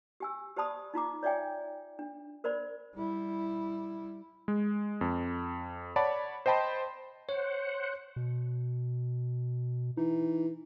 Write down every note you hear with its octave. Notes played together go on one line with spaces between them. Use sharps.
G4 G#5 E6
G4 C5 D5 A5 B5 D#6
D#4 F4 A#5 D6
C#5 D5 E5 G5 G#5
D4
A#4 C5 D5 B5
G3 E4
G#3
F2
C#5 D5 F#5 A5 B5
C5 D#5 G5 A5 B5 C6
C5 C#5 F#5
B2
E3 D#4